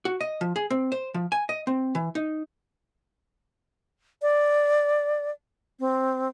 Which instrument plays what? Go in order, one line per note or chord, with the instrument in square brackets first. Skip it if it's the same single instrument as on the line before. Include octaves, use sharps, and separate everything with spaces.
[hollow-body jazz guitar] F#4
D#5
F3
G#4
C4
C5
F3
G#5
D#5
C4
E3
D#4
[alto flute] D5
C4